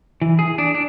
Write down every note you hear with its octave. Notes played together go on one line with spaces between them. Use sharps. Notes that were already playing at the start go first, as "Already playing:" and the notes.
E3
G#4
D4
D4